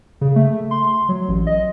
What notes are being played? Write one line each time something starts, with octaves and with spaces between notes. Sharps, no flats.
C#3
A3
C6
F#3
A1
D#5